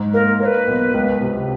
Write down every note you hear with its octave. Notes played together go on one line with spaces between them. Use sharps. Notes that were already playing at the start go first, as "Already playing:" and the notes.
Already playing: G#2
A#3 A#4
A#3 C#5
B4
B1
C#2
C3